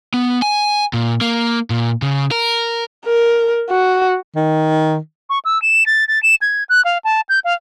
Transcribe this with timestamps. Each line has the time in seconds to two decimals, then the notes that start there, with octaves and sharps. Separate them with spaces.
0.14 B3
0.42 G#5
0.93 A#2
1.21 A#3
1.70 A#2
2.02 C#3
2.31 A#4
3.06 A#4
3.70 F#4
4.36 D#3
5.30 C#6
5.45 E6
5.62 E7
5.86 A6
6.08 A6
6.23 E7
6.42 G#6
6.69 F#6
6.85 F5
7.05 A5
7.29 G6
7.44 F5